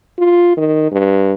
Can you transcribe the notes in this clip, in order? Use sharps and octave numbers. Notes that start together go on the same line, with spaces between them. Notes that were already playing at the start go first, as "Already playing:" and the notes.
F4
D#3
G2